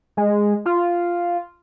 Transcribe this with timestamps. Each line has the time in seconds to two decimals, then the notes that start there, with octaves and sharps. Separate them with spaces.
0.17 G#3
0.66 F4